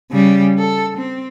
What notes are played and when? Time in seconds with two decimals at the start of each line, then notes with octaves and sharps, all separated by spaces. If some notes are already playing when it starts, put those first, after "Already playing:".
0.11 C#3 G3
0.59 A4
0.98 C4